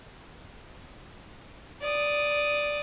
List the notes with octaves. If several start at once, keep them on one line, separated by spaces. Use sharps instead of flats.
D5 D#6